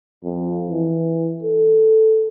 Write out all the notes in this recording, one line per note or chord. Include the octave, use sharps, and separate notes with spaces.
F2
E3
A4